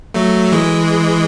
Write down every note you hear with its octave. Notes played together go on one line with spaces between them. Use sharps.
F#3 A3
E3 G#3